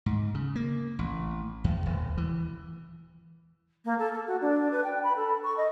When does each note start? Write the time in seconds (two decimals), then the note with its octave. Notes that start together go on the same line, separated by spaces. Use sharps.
0.06 G#2
0.35 C#3
0.56 A#3
0.99 A1
1.64 E2
1.86 D#1
2.17 E3
3.85 A#3
3.98 A4
4.12 A4
4.27 F#4
4.41 D4
4.71 B4
4.84 G5
5.03 B5
5.16 A4
5.44 C#6
5.57 D#5